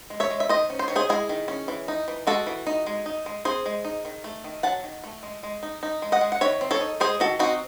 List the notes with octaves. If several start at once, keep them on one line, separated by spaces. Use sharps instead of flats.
G#3
C#5 E5
G#3
E5
D#3 C5 D#5
C#4
C5
D#3 C#5
G#4 C5
G#3 E4 G#4
D#3
C#4
E3
D#4
E3
G#3 F#4 A4
E3
D#4
G#3
D#4
G#3
C4 G#4 C5
G#3
D#4
D#3
A3
D#3
F#3 F#5 A5
D#3
A3
G#3
G#3
D#4
D#4
G#3
D#5 F#5
G#3
F#5
D#3 C#5 E5
C4
A4 C#5
D#4
G#3 G#4 C5
D#3 F#4 A4
C4 D#4 F#4